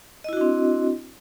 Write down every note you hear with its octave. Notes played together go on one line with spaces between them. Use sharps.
C4 D4 E4 F#4 D#5